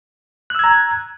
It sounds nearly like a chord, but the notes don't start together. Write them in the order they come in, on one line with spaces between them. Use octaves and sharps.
F#6 E6 G#6 A#5